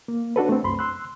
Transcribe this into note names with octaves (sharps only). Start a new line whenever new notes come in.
A#3
D4 F#4 A4 B4
A3 C4
C2 F#2 B5 C6
C6 E6 F#6